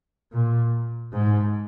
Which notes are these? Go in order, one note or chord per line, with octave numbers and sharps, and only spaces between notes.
A#2
G#2